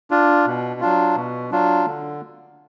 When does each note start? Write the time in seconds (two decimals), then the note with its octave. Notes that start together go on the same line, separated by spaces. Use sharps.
0.11 D4 F4
0.46 B2
0.80 F#3 D4 F4
1.15 B2
1.51 F#3 D4 F4
1.86 D3